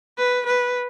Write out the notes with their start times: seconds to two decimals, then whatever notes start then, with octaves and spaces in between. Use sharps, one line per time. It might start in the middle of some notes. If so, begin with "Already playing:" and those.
0.18 B4
0.47 B4